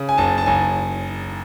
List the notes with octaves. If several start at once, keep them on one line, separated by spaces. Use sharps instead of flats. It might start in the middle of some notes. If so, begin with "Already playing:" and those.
Already playing: C#3
G#5
F#1 A5
A5
F#1 G#5